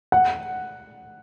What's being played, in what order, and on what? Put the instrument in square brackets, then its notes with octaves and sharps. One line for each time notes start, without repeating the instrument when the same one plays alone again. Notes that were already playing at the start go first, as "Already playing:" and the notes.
[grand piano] F#5